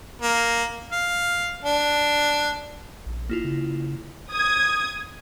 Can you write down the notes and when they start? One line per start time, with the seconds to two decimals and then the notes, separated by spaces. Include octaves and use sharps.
0.22 A#3
0.92 F5
1.64 D4
3.06 A#1
3.29 A#3 E4 F4
3.44 C#3
4.32 D#6 G#6